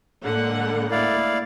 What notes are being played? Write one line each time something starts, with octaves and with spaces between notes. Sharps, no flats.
A2 D3 G#3 A#3 F#5
E4 D5 F5